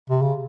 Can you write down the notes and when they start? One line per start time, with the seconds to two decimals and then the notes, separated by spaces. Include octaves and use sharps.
0.10 C3
0.22 C#3